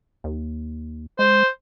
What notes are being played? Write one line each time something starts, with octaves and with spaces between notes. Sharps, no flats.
D#2
G#3 C5